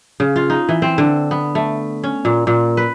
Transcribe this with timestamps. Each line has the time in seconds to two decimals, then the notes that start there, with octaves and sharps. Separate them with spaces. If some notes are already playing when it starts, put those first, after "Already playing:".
0.20 C#3
0.36 F4
0.50 D#4
0.69 E3
0.82 C4
0.98 D3
1.31 B3
1.55 A3
2.04 C#4
2.25 A#2
2.47 A#2
2.77 B4